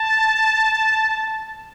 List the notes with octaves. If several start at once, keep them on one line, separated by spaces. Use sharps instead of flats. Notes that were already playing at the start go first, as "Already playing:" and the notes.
Already playing: A5